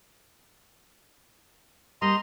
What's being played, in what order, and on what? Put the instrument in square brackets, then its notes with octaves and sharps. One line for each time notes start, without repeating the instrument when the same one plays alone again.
[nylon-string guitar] G3 A#3 [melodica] D#5 A#5 C6